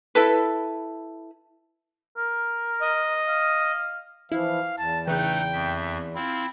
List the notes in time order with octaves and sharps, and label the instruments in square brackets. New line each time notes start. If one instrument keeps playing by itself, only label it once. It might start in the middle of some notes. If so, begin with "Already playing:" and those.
[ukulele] E4 A4 B4
[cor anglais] A#4
[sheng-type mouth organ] D#5
[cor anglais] F5
[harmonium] E3 F3 [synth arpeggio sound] E4 [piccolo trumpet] F5
[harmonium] E2 [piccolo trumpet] A5
[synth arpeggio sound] C#3 E3 [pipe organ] A3 D#4 F#6 [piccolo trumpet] G5
[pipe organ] F2 E5
[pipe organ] C4 E4 [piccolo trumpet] F4